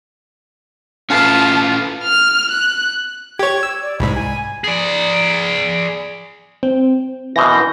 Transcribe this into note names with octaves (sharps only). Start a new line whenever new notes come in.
C#4 F4 A4 B4 F5 A5
F6
F#6
G4 C#5 G#6
E6
D5
C2 G#2 B5
G#5
G#4 D5
C4 G5
F#2 B2 E3 C6 G6 A#6